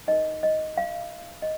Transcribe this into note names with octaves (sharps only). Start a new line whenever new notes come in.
D#4 A#4 D#5
D#5
F5
D#5